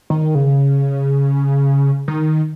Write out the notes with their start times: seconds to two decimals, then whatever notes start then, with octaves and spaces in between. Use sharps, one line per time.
0.10 D#3
0.35 C#3
2.08 D#3